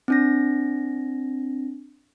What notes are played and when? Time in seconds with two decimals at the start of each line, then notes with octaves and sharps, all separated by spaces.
0.08 C4 D4 A#6